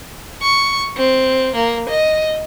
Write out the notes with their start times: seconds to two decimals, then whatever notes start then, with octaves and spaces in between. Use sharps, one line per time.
0.42 C#6
0.97 C4
1.56 A#3
1.89 D#5